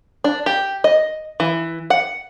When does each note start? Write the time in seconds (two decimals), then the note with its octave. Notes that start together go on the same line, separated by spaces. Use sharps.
0.24 D4
0.46 G4
0.84 D#5
1.40 E3
1.90 F#5